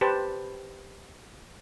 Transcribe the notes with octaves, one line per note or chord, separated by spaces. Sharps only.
G4 B4 C5 A5